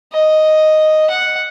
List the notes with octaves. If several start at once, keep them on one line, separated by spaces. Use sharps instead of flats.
D#5
F#5